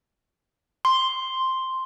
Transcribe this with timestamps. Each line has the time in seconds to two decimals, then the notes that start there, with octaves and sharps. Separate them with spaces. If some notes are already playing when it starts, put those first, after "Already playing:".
0.85 C6